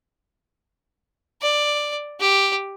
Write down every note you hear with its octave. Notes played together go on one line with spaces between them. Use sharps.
D5
G4